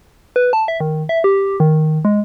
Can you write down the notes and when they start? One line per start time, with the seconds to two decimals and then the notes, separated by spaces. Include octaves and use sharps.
0.36 B4
0.53 A5
0.68 E5
0.80 D#3
1.09 E5
1.24 G4
1.60 D#3
2.05 G#3